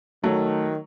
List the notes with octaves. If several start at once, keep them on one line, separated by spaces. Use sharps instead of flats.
D#3 F#3 A3